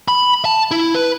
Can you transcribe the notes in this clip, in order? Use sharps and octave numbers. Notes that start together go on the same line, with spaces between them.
B5
A5
E4
B4